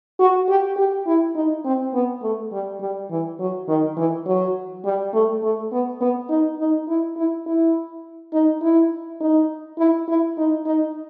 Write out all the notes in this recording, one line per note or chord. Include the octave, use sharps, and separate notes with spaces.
F#4
G4
G4
E4
D#4
C4
B3
A3
G3
G3
E3
F#3
D#3
E3
F#3
G3
A3
A3
B3
B3
D#4
D#4
E4
E4
E4
D#4
E4
D#4
E4
E4
D#4
D#4